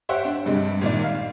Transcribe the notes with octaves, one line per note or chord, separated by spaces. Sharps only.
G4 C5 C#5 E5 F#5 G5
D4
G2 C3 G3 G#3
G#1 A#2 D#3 D5
F5